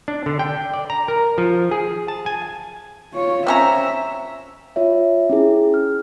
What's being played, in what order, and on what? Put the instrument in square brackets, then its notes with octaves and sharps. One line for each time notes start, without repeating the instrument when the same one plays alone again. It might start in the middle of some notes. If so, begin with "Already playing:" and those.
[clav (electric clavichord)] D4
D3
G5
D5
A#5
A#4
F3
G#4
A5
G#5
[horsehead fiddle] F4 C#5
[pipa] C4 C#4 A#5 [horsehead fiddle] E5
[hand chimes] F4 C#5 E5
C#4 E4 G#4
F6